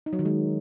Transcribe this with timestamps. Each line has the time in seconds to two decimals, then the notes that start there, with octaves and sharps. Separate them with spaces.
0.06 D#4
0.13 F#3
0.19 D#3
0.25 G#3